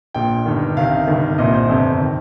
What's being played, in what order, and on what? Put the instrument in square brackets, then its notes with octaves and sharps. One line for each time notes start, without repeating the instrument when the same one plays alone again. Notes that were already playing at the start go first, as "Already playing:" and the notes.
[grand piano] A#1 A#2 G5
G1 G2 D#3
C2 C3 D#3 F5
G1 G2 D#3
C2 A#2 D#5
C5
G1 F2 C3
D#3